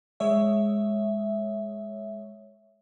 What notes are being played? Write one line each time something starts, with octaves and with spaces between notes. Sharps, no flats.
G#3 C#5 E5